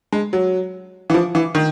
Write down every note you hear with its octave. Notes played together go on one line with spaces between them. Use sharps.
G#3
F#3
E3
F3
E3
D#3